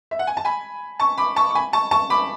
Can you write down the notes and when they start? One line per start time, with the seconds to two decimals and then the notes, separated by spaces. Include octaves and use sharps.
0.11 E5
0.19 F#5
0.27 G#5
0.37 A5
0.45 G#5 B5
1.00 A5 C#6
1.18 B5 D6
1.36 A5 C#6
1.50 C#6
1.55 G#5 B5
1.73 A5 C#6
1.91 A5 C#6
2.10 B5 D6